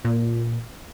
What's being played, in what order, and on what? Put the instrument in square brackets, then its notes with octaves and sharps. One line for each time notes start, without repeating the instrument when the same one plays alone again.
[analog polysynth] A#2